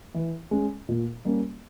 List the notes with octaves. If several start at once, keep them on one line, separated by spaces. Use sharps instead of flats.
E3
G#3 C#4
A#2
G3 A#3 C#4